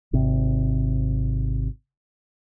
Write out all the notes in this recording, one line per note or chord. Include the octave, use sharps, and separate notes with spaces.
G#1 C3